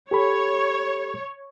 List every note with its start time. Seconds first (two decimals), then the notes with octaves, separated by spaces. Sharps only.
0.11 G4 A4 C#5 B5